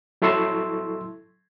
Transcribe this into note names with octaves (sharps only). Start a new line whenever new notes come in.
F#3 E4 A4 C6 C#6 E6